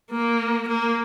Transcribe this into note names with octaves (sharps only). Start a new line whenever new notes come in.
A#3
A#3